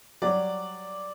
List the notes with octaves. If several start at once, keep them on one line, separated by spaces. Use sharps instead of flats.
F#3 G3 D5